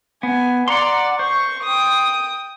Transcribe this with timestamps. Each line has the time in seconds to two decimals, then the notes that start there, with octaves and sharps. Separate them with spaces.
0.23 B3 G#5
0.68 D5 F#5 A#5 C6
1.19 C5 C#6
1.62 G5 D#6